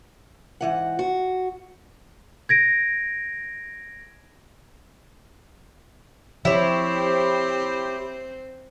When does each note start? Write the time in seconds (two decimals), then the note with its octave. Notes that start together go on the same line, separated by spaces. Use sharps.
0.61 G#2 E3 F#5
0.99 F#4
2.49 G#6 A#6 D7
6.45 F3 C4 E4 G4 C5 C#5